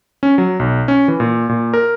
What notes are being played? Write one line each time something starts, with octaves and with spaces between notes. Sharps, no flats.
C#4
F#3
B1
C#4
E3
A#2
A#2
A#4